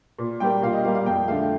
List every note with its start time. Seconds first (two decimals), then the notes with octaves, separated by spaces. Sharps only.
0.19 A#2
0.40 G3 A#3 G5
0.62 A#2 F5
0.73 D#5
0.84 G3 A#3 F5
0.95 F5
1.06 F2 G5
1.28 D3 A3 F5